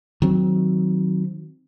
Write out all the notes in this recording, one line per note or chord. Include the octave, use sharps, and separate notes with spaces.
D#3 F#3 C4